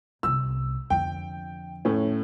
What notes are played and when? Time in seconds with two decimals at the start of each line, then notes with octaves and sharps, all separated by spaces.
0.23 G1 C2 E6
0.90 F2 D3 G5
1.85 A2 A3 C#4